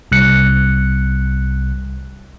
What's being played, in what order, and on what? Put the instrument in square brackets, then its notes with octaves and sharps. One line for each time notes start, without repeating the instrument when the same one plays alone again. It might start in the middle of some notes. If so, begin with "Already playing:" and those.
[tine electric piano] C2 F#6 C#7